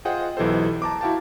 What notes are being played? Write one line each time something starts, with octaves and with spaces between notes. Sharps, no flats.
F4 G#4 C5 D#5 F#5 G5
B1 E3 G4 A4 C5 D#5
A5 A#5 D6
E4 F#4 F5 G5 A5